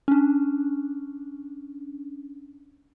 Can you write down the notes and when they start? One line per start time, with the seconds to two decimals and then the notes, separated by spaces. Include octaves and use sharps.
0.08 C#4 D4